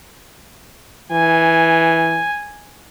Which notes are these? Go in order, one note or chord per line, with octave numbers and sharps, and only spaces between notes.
E3 G#5